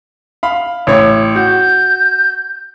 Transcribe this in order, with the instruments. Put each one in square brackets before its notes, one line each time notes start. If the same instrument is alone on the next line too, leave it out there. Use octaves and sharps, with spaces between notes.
[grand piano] F5 B5
A1 C#5
[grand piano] F#4 [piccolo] G6